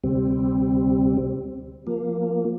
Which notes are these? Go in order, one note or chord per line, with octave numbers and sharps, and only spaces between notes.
D2 C3 G3 C4
F3 A#3